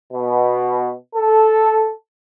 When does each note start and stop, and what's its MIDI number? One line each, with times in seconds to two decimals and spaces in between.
0.13 0.92 47
1.16 1.91 69